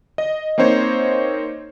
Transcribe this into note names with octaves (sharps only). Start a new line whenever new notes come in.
D#5
A#3 C4 D#4 C5 C#5